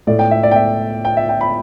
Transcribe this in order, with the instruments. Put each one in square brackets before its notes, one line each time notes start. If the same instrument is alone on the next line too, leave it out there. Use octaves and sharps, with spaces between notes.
[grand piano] A2 A3 D5
G5
E5
D5
G5
E5
G5
E5
G5
B5